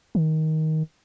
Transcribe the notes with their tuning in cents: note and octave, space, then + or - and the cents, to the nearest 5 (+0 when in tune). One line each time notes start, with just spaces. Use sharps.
D#3 +15